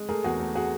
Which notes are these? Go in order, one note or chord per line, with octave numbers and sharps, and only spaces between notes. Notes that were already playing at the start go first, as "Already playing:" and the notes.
Already playing: G#3
A3 G#4 A#4
E2 F#4 G#4
A3
F#4 G#4